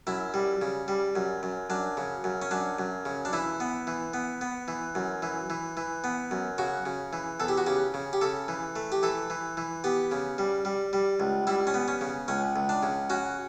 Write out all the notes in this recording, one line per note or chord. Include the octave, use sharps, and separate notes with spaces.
F#2 E4
G3
C#3
G3
F#2
F#2
F#2 D4
C#3
F#2
C#4
F#2 D4
F#2
C#3
D4
E3 E4
B3
E3
B3
B3
E3
F#2
E3
E3
E3
B3
F#2
C#3 F#4
C#3
E3
E2 A4
G4
F#4
C#3 G4
C#3
G4
C#3 A4
E3
A3
G4
E3 A4
E3
E3
B3 G4
C#3
G3
G3
G3
C#2
G3 E4
C#4
B3
C#4
C#3
C#2 C#4
C#2
D4
C#3
C#4 F#4